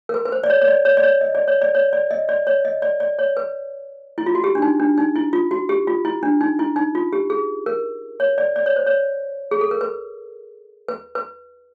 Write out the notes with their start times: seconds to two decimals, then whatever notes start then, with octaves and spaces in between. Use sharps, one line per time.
0.09 A#4
0.14 B4
0.26 B4
0.32 C5
0.44 D5
0.50 C#5
0.61 C#5
0.68 D5
0.85 C#5
0.97 D5
1.03 C#5
1.21 D#5
1.35 D5
1.48 C#5
1.62 D5
1.75 C#5
1.93 D5
2.11 D#5
2.29 D5
2.47 C#5
2.65 D#5
2.82 D5
3.00 D5
3.19 C#5
3.37 B4
4.18 E4
4.26 F4
4.35 F#4
4.44 G4
4.55 D4
4.62 D#4
4.80 D4
4.98 D#4
5.16 E4
5.33 F4
5.51 F#4
5.69 G4
5.87 F4
6.05 E4
6.23 D4
6.41 D#4
6.59 E4
6.76 D#4
6.95 F4
7.13 G4
7.30 G#4
7.66 A#4
8.20 C#5
8.38 D5
8.56 D5
8.66 C#5
8.76 C5
8.86 C#5
9.51 G#4
9.61 A4
9.71 A#4
9.81 B4
10.88 B4
11.15 B4